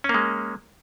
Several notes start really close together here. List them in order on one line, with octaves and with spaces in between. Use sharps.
C#4 A#3 G#3